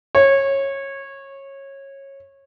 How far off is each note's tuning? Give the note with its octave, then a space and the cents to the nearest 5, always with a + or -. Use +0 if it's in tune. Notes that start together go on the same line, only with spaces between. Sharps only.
C#5 -20